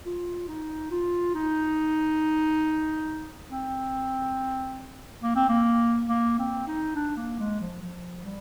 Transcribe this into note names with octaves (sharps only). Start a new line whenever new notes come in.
F4
D#4
F4
D#4
C4
A#3
C4
A#3
A#3
C4
D#4
D4
A#3
G#3
F3
F3
G3